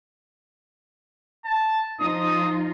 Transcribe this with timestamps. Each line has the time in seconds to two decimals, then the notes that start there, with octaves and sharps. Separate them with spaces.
1.45 A5
2.00 F3 D#4 F4 D#6